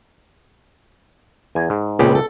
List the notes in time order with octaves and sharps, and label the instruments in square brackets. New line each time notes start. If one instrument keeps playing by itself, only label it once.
[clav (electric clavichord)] E2 G#5
G#2
[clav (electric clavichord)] C#2 C#3 G4 [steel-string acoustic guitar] A#2 B3 C4
[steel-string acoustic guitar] A4